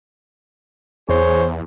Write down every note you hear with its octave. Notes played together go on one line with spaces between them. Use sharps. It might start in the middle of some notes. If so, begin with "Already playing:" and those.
E2 G#4 C5 C#5